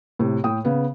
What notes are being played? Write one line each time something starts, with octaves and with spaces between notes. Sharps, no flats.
A2 C3
A2 G5 D#6
C#3 B3